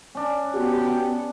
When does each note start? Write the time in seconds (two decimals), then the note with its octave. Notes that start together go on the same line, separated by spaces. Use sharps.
0.15 C#4 D4
0.55 B3 F#4 G4